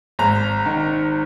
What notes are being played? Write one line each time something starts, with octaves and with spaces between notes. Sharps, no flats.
G#1 A#5
D#3